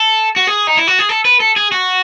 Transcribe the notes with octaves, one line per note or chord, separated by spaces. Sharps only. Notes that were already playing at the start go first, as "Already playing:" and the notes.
Already playing: A4
F#4
G#4
D#4
E4
F#4
G#4
A4
B4
A4
G#4
F#4